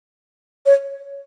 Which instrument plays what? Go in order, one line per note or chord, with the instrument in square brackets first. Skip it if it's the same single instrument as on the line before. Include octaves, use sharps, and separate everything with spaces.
[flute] C#5